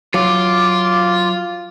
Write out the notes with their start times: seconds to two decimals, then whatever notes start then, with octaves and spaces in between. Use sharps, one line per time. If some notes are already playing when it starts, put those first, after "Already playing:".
0.14 F#3 F4 D6